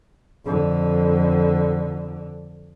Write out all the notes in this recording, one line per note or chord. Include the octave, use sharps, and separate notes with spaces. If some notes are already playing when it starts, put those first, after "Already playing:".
F2 D3